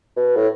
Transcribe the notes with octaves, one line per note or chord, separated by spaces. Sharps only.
B2
A2